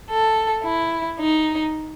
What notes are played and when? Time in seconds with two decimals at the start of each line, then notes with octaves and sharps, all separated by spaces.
0.12 A4
0.65 E4
1.21 D#4